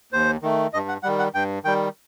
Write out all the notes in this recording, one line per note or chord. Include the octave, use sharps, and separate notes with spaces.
D#2 C5
D#3 A3
G2 D#5
F#5
D#3 G3 F#5
F#5
G2 G5
D#3 G3 G5